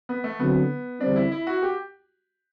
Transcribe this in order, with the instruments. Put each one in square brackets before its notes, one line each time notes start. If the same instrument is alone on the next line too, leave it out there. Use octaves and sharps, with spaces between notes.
[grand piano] B3
A3
[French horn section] D3 F#3 C4 [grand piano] B3
[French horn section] E2 D3 G3 C4 [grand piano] D4
[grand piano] E4
E4
F#4
G4